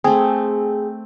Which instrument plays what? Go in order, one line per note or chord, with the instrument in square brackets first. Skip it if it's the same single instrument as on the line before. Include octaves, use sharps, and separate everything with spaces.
[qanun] A3 C4 [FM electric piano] G#4